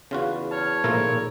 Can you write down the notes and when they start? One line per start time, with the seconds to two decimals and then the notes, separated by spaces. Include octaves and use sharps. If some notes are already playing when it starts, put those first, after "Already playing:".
0.11 E2 C#3 F4 F#4
0.51 C#5 A5 F6
0.84 G#1 A#2 F3 A3 F4 A#4 E6